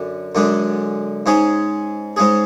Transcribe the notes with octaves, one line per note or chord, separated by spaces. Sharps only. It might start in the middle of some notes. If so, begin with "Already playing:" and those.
Already playing: F#2 D3 D4
F#2 D3 G#3 D4
G#2 G#3 C#4 G#4
G#2 G#3 C#4 G#4